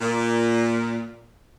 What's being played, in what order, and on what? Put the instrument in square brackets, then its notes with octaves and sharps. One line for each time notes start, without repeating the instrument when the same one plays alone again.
[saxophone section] A#2